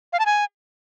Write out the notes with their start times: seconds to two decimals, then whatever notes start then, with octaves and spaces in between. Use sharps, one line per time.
0.13 F5
0.19 A5
0.26 G#5